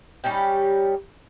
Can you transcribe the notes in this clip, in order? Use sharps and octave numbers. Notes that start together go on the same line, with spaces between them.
G3 C#4 D#4 G4